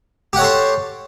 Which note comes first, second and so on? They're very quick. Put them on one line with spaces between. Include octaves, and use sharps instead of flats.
G4 F#5 C#5 A4 C6